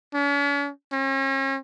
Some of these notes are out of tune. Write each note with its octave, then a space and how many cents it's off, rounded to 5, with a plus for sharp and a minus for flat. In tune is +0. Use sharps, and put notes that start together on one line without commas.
C#4 +45
C#4 -40